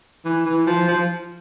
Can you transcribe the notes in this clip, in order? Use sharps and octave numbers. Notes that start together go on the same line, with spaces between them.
E3
E3
F3
F3